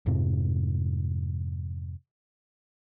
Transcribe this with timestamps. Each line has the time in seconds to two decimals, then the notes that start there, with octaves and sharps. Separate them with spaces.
0.06 F2 G#2 C3